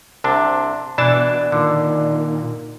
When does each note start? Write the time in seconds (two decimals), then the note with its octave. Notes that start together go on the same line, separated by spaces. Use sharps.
0.24 C2 C3 D4 A5
0.98 B2 E3 D4 D5 A5
1.52 A#2 D3 D#3